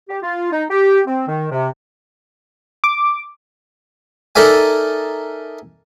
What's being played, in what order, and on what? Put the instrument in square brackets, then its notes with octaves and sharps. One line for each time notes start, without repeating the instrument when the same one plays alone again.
[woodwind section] G4
F4
D#4
G4
C4
D#3
C3
[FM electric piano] D6
[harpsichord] D#4 A4 A#4 D5 E5 G#5